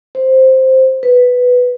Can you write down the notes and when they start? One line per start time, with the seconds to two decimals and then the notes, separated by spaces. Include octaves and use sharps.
0.15 C5
1.03 B4